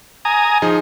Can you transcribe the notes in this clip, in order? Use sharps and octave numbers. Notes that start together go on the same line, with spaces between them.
G#5 A#5 D#6
F3 D#4 G#4